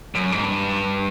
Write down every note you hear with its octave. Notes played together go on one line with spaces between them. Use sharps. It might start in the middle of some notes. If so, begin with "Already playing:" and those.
F#2
G#2
G2